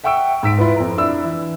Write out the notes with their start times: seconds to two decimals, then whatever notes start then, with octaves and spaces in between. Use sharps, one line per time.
0.04 E5 F#5 G5 C#6 E6 D7
0.43 G#2 E6 B6 D7
0.58 E4 F4 B4
0.76 F2 A#5
0.97 D4 E4 E6
1.24 E3